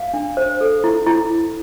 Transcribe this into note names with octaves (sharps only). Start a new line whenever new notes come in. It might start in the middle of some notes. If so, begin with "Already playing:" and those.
Already playing: F5
D4
C5
A4
E4
E4